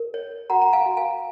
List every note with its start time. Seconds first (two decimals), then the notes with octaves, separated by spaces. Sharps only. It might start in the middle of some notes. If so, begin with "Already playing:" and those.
Already playing: A#4
0.14 C#5
0.50 F#4 F#5 A#5
0.62 A#5
0.73 F5 G#5
0.86 F#4
0.97 F5 G#5